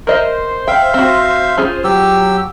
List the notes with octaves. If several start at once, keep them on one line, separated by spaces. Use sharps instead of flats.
A#4 C5 D#5 E5
E5 F5 G5
C4 F#4
C#4 F4 G#4
F#3 G4 E6